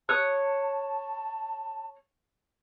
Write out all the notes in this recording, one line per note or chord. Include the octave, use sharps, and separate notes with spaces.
C#5 A5 D#6 F#6